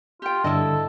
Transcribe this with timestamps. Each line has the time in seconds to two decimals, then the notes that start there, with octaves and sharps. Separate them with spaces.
0.22 F4 G4 G5
0.44 G2 D3 E4 A4 D#5